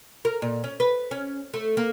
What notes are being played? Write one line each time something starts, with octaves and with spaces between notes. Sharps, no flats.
A#4
A#2
C#4
B4
C#4
A3
A#3